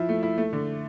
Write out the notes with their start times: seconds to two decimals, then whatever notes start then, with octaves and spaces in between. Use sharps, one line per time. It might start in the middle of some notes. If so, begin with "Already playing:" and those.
Already playing: F3 E4
0.09 A3
0.23 E4
0.38 A3
0.53 D3